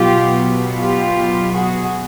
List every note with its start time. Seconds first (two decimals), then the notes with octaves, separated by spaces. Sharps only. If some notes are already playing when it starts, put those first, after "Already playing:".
Already playing: B2 F#3 B3 F4 G4
0.77 F4 G4
1.53 F#4 G#4